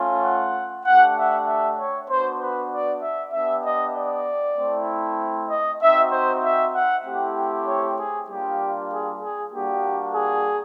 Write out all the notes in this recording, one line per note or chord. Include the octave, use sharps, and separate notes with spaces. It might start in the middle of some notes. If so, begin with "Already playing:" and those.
Already playing: A3 C#4 F4
F#5
A3 D4 G4 F#5
E5
E5
C#5
B3 D4 F#4 C5
B4
D5
E5
B3 D4 G4 E5
D#5
D5
A3 C4 E4
D#5
C4 D#4 F#4 E5
C5
E5
F#5
A3 C4 E4 G4
C#5
G#4
G3 A#3 D4 F4 G4
G#4
G#4
G3 A#3 D4 F#4 G4
G#4